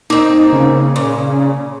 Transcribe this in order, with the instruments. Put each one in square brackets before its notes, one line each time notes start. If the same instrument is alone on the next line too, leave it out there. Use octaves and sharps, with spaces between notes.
[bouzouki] A#3 C4 [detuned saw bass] D#4
[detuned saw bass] C#3
[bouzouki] A#2